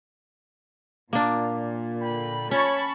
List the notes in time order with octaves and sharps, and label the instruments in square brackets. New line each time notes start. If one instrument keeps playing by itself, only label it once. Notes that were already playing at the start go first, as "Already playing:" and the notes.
[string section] A#2 [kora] A#3 D4
[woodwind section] D3 G5 B5
[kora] C#4 [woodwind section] C#5 [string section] A5 B5 C#6